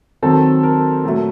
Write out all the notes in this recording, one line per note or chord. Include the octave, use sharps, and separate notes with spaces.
D#3 F#3 C4 A4
A#4
A#2 F#3 A3